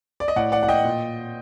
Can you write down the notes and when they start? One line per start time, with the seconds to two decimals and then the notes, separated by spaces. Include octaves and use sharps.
0.20 D5
0.28 D#5
0.36 A2 D5 F#5
0.52 D5 F#5
0.63 F#5
0.68 D#5 G5
0.84 A#2